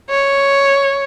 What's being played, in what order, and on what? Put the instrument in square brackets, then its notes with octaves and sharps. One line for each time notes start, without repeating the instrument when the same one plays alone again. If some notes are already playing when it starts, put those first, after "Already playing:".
[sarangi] C#5